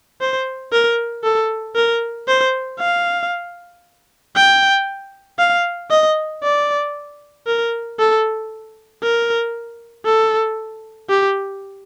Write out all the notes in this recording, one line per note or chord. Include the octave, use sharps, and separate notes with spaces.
C5
A#4
A4
A#4
C5
F5
G5
F5
D#5
D5
A#4
A4
A#4
A4
G4